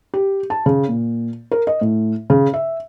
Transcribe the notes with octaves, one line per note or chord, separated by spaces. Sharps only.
G4
A5
C#3
A#2
A#4
D#5
A2
C#3
E5